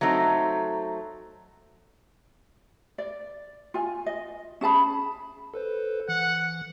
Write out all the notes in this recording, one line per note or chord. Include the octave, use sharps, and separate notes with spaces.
F#3 A3 C4 D#4
D5
F4 G#5
D#5
C#4 G#4 A5 B5
A4 B4 C5
E3 F#5